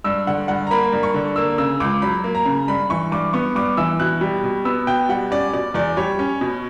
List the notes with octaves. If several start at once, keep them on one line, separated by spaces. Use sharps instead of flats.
G2 E6
D3 F#5
G2 F#5
A#5
A#3 B5
G2
C#6
D3
A#3 E6
C#3 E6
C#2 D6
F#3 B5
A#3
A#5
C#3
G2 B5
E3 C#6
G2 D6
B3 C#6
G2 D6
E3 E6
B2 F#6
G3
B2
B3 E6
B2 G5
G3 F#5
C#4 D5
B2 D5
E2 D5
G3 C#5
C#4
B2